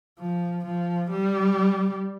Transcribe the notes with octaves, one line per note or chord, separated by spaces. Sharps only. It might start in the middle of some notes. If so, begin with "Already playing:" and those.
F3
F3
G3